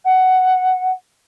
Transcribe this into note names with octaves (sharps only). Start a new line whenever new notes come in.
F#5